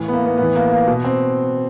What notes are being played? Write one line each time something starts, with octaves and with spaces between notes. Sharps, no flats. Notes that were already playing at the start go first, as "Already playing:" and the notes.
Already playing: A2 E3
B3
A#3
B3
A2 E3 B3
A#3
A#3
B2
C4